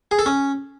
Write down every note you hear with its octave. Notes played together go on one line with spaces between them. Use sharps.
G#4
A4
C#4